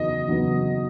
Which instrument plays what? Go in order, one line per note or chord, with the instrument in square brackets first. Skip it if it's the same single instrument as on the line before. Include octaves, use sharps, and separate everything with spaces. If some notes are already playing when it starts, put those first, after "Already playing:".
Already playing: [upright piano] F#1 E2 D#3 F#3 B3 [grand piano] D#5
[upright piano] F#1 E2 D#3 F#3 B3